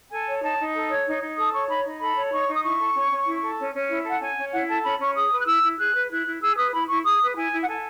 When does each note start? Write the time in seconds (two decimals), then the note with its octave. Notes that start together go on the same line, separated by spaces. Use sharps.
0.11 A4 G#5
0.27 C#5
0.42 D#4 A5
0.58 D#4
0.74 A4
0.89 C#5
1.06 D#4
1.21 D#4
1.37 A4 D#6
1.52 C#5 C#6
1.69 D#4 B5
1.84 D#4
1.99 A4 B5
2.16 C#5
2.31 D#4 C#6
2.47 D#4
2.53 D#6
2.63 E4 C#6
2.79 A4
2.94 C#4
3.10 C#4
3.26 E4
3.42 A4
3.58 C#4
3.73 C#4
3.89 E4
4.04 A4
4.09 F#5
4.20 C#4 G#5
4.36 C#4
4.53 E4 F#5
4.68 A4 A5
4.84 C#4 B5
4.99 C#4 C#6
5.15 G#4 D#6
5.31 B4
5.40 F#6
5.46 E4 E6
5.62 E4
5.78 G#4 F#6
5.94 B4
6.10 E4 F#6
6.25 E4
6.41 G#4 E6
6.56 B4 D#6
6.72 E4 B5
6.88 E4 C#6
7.04 G#4 D#6
7.20 B4
7.36 E4 G#5
7.52 E4
7.61 F#5
7.67 A4 G#5